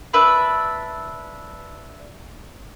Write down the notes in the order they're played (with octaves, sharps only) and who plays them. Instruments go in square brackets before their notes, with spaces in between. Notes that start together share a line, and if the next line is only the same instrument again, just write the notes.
[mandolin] D4 B4 E5